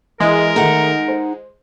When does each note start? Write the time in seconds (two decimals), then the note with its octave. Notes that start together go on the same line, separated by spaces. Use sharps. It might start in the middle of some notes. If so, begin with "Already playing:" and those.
0.20 E3 G#3 A#4
0.56 D#3 A3 D#4 F#5
1.08 C5